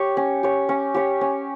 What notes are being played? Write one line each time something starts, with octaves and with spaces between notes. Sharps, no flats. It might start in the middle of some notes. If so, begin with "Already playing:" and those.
Already playing: G4 C#5
C#4
G4 C#5
C#4
G4 C#5
C#4